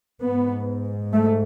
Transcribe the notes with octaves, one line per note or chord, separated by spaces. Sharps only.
G#2 B3
A3